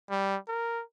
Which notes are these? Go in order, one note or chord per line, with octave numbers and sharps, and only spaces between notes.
G3
A#4